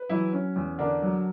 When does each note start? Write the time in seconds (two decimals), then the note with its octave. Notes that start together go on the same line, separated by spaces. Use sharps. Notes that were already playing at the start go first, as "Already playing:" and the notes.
Already playing: B4
0.09 E3 F#3 E4
0.33 C#4
0.56 E2
0.79 D3 D4 A#4
1.02 F#3